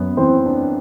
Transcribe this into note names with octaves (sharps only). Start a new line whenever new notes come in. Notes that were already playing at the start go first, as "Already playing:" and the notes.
Already playing: F#2 B3
E3 C4 C5
D4